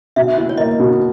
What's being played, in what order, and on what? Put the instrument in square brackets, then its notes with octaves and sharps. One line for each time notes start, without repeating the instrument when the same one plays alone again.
[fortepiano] B2 [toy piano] E5
[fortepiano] E4
[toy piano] C#5
[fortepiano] A#3 [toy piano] D#5
[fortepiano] B2